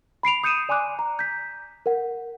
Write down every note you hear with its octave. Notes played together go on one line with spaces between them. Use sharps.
B5 C7 D7 F7
D#6 G6 C#7 D#7 E7
D5 G#5 C6 D6 F#6
A#5
G6 B6
A#4 F#5